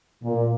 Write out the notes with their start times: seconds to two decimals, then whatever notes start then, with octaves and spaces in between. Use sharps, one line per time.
0.24 A#2